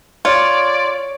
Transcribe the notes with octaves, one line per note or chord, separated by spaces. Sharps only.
F4 C#5 D5